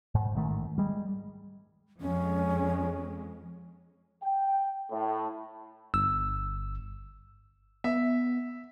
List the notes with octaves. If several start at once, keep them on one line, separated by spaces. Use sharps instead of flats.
G#2
A1 G#2 D#3 A3
G3 G#3
F2 G#3 C#4
G5
A2
G1 E6
B3 E5